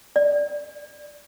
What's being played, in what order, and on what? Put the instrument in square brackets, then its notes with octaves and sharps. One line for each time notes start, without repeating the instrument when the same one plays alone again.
[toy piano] D5